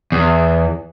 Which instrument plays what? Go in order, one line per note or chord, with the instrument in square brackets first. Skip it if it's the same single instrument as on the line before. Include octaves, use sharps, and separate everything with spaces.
[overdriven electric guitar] E2